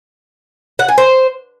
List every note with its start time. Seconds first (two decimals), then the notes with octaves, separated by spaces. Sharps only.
0.79 F#5
0.88 G#5
0.98 C5